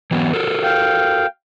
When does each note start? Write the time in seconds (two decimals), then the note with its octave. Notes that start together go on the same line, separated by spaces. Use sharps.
0.11 E3 F#3 B3
0.33 F#4 A4 A#4
0.64 F5 G5